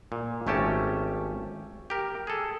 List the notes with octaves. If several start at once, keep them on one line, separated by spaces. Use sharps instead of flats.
A#2
G#1 A3 C#4 G4 A5
G4 A#4
G#4 A4